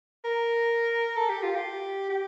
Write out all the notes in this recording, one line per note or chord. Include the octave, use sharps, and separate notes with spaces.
A#4
A4
G4
F4
G4
G4